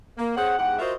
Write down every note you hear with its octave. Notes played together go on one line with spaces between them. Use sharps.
A#3
C4 G#4 C#5 F#5
E2 G#2 G4 F#5
F4 F#4 A#4 C5 D#5 E5